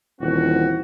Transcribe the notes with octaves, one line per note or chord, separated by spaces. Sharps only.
D#1 E3 C4 F#4